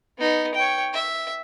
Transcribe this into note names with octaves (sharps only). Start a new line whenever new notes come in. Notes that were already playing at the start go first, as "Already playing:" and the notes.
B3 D#4
C#5 G5
E5